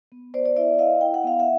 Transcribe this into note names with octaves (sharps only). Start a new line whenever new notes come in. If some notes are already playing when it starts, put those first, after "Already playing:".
B3
B3 C5 D5
C5 D5
E4 D5 E5
E4 D#5 F5
E4 G5
F#5
B3 F5
E5 F#5